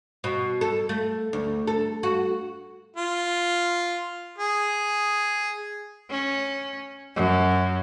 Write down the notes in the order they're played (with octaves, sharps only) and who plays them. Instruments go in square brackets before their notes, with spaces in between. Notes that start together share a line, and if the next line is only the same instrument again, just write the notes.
[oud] B2
A4
A3
D2
A4
F#4
[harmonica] F4
G#4
[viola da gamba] C#4
F#2